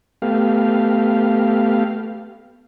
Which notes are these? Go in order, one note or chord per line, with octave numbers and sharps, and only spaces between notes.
A3 B3 G4 F5